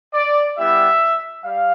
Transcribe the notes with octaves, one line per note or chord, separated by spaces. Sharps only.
D5
G3 B3 E4 G4 E5
G3 F5